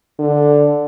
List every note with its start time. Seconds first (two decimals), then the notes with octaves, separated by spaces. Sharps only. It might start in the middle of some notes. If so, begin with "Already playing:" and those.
0.19 D3